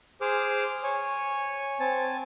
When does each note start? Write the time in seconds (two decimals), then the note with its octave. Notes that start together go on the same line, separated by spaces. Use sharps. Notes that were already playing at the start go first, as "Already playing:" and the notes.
0.21 G#4 C5 D6 F6
0.83 C#5 G#5
1.80 C4 G#5 A5